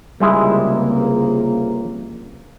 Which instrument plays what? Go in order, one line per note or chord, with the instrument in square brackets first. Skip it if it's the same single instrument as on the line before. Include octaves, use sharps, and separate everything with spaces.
[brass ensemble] C#2 C3 A#3 [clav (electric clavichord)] G3 G#3 E4